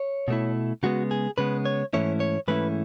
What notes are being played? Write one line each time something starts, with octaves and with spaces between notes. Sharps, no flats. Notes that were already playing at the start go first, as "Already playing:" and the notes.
Already playing: C#5
B2 A3 E4
C#3 G#3 B3 F#4
G#4
C#3 G#3 B3 B4
C#5
G#2 E3 A3 C#4 E4 C#5
C#5
G#2 E3 A3 C#4 E4 B4